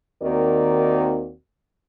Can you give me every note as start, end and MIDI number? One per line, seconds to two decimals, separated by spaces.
0.23 1.32 39
0.23 1.32 51
0.23 1.32 60
0.23 1.32 66
0.23 1.32 70
0.23 1.32 74